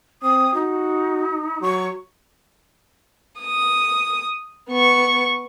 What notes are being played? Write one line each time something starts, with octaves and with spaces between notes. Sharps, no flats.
C4 D#6
D#4 F#4
F#3 C#6
D#6
B3 C#6